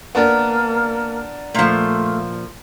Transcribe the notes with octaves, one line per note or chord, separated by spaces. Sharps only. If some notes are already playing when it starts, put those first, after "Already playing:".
A#3 B3 D4 A#4
A#2 F3 A3